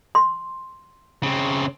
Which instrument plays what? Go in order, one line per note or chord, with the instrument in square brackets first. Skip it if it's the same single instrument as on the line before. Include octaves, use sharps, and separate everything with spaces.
[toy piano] C6
[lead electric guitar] C#3 C4